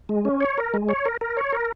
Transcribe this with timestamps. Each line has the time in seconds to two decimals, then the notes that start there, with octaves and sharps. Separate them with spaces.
0.09 G#3
0.25 C#4
0.40 C#5
0.58 A#4
0.74 G#3
0.89 C#5
1.05 A#4
1.21 A#4
1.37 C#5
1.52 A#4